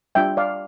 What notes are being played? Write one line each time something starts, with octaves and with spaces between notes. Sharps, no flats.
G3 D4 F4 E5 G5
D5 F5